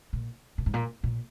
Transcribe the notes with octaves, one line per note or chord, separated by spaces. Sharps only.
A#2
A#2
G#2
A#2
A#2